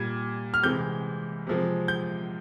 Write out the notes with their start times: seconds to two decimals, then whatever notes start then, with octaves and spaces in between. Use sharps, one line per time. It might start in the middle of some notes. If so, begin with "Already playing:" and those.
Already playing: A#2 G3 G#6
0.54 F6
0.63 C3 E3 G#3 G6
1.47 C3 F3 G#3
1.88 G6